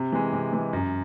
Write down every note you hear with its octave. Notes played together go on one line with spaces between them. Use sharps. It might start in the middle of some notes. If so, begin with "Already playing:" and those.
Already playing: C3
E3 G#3
C3
E3 G#3
F#2